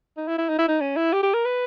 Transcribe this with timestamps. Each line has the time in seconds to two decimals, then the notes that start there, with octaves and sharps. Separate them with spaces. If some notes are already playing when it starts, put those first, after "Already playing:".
0.17 D#4
0.27 E4
0.38 E4
0.49 D#4
0.58 E4
0.68 D#4
0.81 C#4
0.96 E4
1.13 G4
1.23 G4
1.34 A#4
1.45 B4